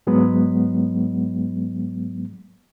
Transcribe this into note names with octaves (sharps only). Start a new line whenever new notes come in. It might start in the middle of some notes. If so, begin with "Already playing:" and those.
G#2 F#3 G#3 B3